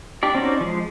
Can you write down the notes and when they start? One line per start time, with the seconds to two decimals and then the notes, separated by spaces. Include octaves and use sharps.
0.23 D4 G4 D5
0.35 C4 C#4 D#4 F#4 D5
0.61 F3 G#3